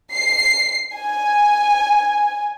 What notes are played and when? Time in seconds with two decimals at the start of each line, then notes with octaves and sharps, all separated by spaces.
0.13 C7
0.95 G#5